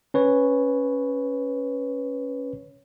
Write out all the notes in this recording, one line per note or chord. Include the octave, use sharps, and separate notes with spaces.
C#4 B4 C#5